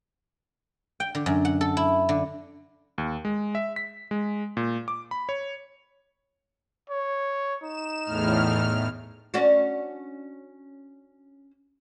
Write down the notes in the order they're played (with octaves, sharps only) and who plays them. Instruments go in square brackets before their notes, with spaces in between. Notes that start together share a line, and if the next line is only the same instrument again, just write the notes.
[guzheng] G5
D3
F#2
F#5
A4
E4
D3
[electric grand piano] D#2
G#3
E5
B6
G#3
A#2
D6
B5
C#5
[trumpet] C#5
[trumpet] D#4 [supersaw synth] E7
[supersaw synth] E2 A2 F6
[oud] C#4 D4 F#4